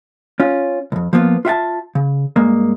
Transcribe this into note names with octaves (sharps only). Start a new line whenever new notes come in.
C#4 F4
C2 F2
F3 A#3 B3 F4
F4 E5 F#5 A5
C#3
G2 G#3 A#3